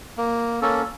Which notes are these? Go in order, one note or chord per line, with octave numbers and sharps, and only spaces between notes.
A#3
A#3 C#4 A4